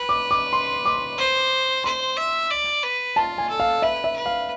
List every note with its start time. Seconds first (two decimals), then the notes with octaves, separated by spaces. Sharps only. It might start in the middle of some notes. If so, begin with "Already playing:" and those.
Already playing: B4
0.09 D6
0.31 D6
0.53 C6
0.85 D6
1.18 C5
1.84 C5 C6
2.17 E5
2.51 D5
2.83 B4
3.16 F4 A5
3.38 G#5
3.49 A4
3.60 F5
3.82 B4 E5
4.04 E5
4.15 B4
4.26 F5